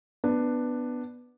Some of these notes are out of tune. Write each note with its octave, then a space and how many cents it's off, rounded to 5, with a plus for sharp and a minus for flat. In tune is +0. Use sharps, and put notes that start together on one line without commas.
B3 +0 D4 +10